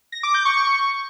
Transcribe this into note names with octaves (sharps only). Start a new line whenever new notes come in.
A#6
D6
G6
C#6